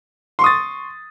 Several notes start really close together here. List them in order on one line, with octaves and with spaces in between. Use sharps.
C6 C#6 D#6 A6